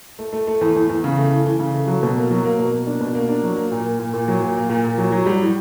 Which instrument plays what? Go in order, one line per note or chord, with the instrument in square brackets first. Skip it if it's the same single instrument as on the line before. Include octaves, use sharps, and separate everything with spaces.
[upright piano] A3
A3
A3
E2
E2
E2
C#3
A3
E3
E3
C#3
A3
F#3
B2
A#3
F#3
A#3
B2
A#3
D4
B2
A#3
D4
F#3
A#3
A#2
A#3
A#2
A#2
F#3
A#2
A#3
A#2
A#2
F#3
F#3
G3
A2